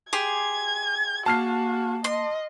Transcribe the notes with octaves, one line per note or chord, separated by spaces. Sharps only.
G4 G#4 C6 G#6
A#3 F#4 A5 F6 C7
D#5 C6